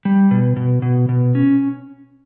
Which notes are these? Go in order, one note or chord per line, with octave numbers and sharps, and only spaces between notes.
G3
B2
B2
B2
B2
C#4